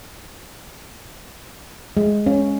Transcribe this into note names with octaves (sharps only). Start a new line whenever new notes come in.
G#3
C#4